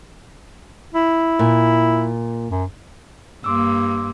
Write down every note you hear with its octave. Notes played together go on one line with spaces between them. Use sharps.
E4
A#2
F#2
G2 A#3 C6 D6 E6